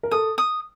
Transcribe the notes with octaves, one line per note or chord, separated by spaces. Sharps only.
A#4
A4 D#6
D#6